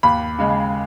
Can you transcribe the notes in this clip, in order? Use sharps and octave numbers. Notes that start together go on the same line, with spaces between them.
D#2 B5
C#3 G#3